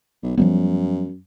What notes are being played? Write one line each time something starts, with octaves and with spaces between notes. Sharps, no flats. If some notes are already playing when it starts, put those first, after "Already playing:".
B1
F#2 F3 G3 B3